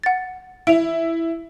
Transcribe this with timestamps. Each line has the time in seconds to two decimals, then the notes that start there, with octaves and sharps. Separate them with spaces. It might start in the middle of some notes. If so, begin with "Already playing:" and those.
0.03 F#5 A6
0.67 E4 D7 F7